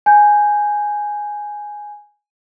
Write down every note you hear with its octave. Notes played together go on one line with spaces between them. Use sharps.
G#5 G6